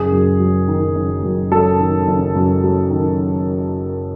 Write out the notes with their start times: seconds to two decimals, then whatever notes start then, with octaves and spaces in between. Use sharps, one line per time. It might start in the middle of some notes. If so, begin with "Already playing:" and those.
Already playing: F#1 G#4
0.12 F#2
0.40 F#3
0.68 D#3
0.95 F#1
1.23 F#2
1.51 F#3 A4
1.80 D#3
2.07 F#1
2.35 F#2
2.63 F#3
2.90 D#3